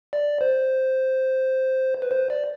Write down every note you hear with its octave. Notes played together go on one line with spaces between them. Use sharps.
D5
C5
B4
C5
D5